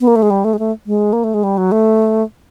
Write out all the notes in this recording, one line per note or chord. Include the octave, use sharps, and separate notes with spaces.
B3
A#3
A3
G#3
G3
A3
G#3
A3
G#3
A#3
A3
G#3
G3
F#3
A3